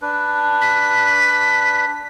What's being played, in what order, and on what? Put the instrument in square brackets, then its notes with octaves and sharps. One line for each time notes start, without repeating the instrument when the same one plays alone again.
[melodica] D4 B4
[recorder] B6